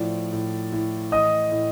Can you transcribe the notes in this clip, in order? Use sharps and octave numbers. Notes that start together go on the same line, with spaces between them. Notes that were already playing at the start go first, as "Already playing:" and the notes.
Already playing: A2 F3 D5
A2
A2
E3 D#5 D#6
A2